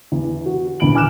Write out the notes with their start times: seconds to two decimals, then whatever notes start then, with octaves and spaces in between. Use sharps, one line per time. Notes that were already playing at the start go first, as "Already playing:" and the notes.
0.12 E2
0.46 F#4
0.80 D#1 E2 D3 B5 D7 F#7
0.95 G#5 D6 F6 F#6 E7